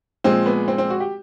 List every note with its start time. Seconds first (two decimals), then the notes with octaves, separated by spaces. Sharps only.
0.24 A#2 F3 G#3 C4
0.46 B3
0.68 C4
0.78 C4
0.90 F#4
1.00 G4